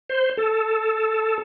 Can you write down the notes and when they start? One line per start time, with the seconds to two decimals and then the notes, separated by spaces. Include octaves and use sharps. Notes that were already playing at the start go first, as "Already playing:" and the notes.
0.09 C5
0.37 A4